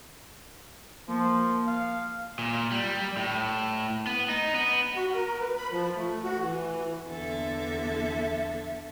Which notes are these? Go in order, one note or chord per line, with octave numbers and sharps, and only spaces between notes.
F3 A#3
F5
A#2
G3
A2
B3
D#4
B3
F#4
A#4
B4
B5
F3
A3
F#4
E3
E2 D3 A4 E5